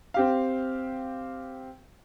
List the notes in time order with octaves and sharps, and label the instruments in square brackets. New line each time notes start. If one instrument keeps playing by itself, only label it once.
[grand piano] C4 G4 F5